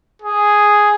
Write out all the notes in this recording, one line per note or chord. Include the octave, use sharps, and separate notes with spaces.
G#4